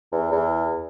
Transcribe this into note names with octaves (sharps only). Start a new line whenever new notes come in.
E2
E2